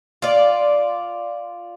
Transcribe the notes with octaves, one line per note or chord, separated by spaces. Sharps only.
F4 D5